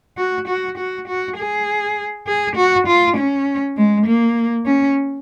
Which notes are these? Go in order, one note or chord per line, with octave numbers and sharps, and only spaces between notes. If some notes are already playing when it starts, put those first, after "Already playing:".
F#4
F#4
F#4
F#4
G#4
G#4
F#4
F4
C#4
G#3
A#3
C#4